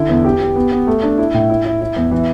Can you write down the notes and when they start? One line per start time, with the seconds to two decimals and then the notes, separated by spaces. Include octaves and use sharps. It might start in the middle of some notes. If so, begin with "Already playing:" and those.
Already playing: D3 E4
0.09 E2
0.25 G4
0.40 G4
0.56 B3
0.72 B3
0.87 A3
1.03 D4
1.18 E4
1.34 A2
1.49 E4
1.65 E4
1.81 E4
1.96 E2
2.11 E3